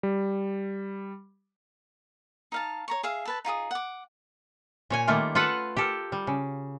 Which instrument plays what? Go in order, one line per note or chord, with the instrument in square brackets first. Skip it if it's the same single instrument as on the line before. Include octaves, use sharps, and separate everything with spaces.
[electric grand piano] G3
[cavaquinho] D#4 F5 A5
C#5 A#5 C#6
G#4 E5 F5
A4 B4 A5
D#4 F4 G#4 D#6
F#5 D6
[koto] A#2 C#5 G#5
D#3 G3 A3 A#3 F4 A#4
F4 A4 B4 F#5 A5
G4 A4 A#4
G3
C#3